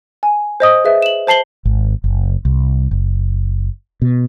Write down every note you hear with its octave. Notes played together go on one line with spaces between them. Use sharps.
G#5
C5 D#5 D#6
G#4 B4 E5
E7 F#7
C5 A5 C7 F#7 G7
G#1
F#1
C2
F#1
B2